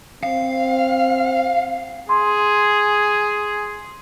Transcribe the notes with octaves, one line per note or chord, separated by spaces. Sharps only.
C4 F5
G#4 C6